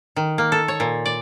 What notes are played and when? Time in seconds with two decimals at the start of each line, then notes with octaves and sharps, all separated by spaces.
0.16 D#3
0.38 A#3
0.52 A4
0.68 C#5
0.80 A#2
1.06 D5